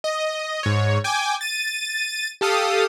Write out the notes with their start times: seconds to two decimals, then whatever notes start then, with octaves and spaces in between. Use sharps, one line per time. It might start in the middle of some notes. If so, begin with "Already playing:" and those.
0.04 D#5
0.63 G#2 C#5
1.04 G5 G#5 D6
1.41 A6 D#7
2.41 G4 A4 F5 D#6